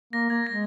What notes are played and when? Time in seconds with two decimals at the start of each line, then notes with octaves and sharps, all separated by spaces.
0.13 A#3 A#6
0.30 A#3 G#6
0.47 G#3 A#6